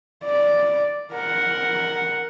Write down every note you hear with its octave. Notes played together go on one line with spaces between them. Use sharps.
D5
A#4 F#5